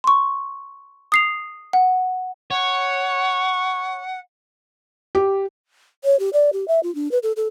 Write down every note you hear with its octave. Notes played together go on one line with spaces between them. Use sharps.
C6 C#6
D#6 C7 F7
F#5
C#5 F#5
G4
C#5
G4
D5
G4
E5
F4
D4
B4
A4
A4